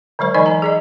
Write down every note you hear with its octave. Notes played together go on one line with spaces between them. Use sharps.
D3 F#3 G#3 C5
D3 E3 D#4 D5 D#5 G#5
A#5
G#4 D5 D#5